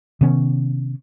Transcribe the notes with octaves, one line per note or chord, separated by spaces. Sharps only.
C3 D#3 B3 C#4